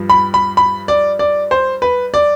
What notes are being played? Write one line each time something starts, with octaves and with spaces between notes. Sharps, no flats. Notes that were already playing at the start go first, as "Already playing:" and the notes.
Already playing: G2 F3
B5
B5
B5
D5
D5
C5
B4
D5